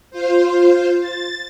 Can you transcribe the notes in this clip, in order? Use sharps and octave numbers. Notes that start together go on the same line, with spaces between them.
F4 C5
A6